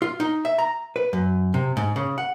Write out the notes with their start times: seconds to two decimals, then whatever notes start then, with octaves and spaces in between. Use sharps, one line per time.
0.02 F4
0.20 D#4
0.45 E5
0.58 A#5
0.96 B4
1.13 F#2
1.54 C3
1.77 G#2
1.96 C#3
2.18 F#5